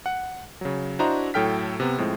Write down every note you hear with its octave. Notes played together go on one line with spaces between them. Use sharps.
F#5
C#3 F#3
D4 E4 F#4 C5 D#5 A#5
A2 F#3 A4 G5 F6 B6
C3 B3
A2 F3 G#3 C4